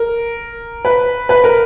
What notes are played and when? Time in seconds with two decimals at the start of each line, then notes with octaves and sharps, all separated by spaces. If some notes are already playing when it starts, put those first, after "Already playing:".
Already playing: A#4
0.85 B4
1.29 B4
1.44 A#4